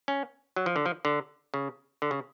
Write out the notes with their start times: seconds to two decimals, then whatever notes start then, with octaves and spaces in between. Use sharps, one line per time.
0.08 C#4
0.56 F#3
0.66 F3
0.76 D3
0.86 F3
1.05 D3
1.54 C#3
2.02 D3
2.11 C#3